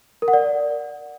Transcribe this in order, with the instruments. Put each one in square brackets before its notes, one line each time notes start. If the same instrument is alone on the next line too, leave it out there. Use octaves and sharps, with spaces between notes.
[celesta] A#4
F#5
D5